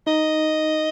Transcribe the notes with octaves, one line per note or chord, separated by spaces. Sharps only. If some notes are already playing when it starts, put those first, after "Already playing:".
D#4 D#5